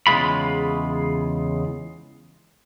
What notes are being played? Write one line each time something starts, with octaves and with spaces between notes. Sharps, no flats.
E2 C#3 F3 G#3 F4 B5